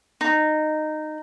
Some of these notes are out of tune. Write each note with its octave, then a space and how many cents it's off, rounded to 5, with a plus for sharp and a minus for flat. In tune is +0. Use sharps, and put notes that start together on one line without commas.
D#4 -15